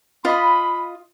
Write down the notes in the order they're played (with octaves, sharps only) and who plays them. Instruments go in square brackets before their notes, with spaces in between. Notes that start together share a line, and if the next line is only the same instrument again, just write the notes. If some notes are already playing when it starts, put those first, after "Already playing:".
[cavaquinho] F4 D#5 [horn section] B5